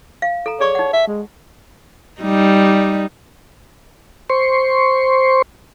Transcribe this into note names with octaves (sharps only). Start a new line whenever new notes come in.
F5
A4 A#5
G#4 C#5 D5 C#6
D#4 F#5
E5
G#3
G3 D#4
C5 C6 C#6